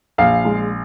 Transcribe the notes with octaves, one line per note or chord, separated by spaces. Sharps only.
A#1 F5
G#3